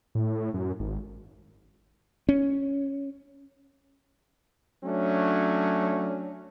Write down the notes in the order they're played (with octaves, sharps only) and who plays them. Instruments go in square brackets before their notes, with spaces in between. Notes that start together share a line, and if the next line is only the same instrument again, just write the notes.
[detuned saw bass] A2
F#2
G#1
[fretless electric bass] C#4
[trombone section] F#3 A3 C#4 D4